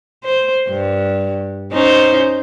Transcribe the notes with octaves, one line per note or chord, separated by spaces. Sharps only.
C5
G2
C#4 D#4 C5